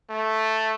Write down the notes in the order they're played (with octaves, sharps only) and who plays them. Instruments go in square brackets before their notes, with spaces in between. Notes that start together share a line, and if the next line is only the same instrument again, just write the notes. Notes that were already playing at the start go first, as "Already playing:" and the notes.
[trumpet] A3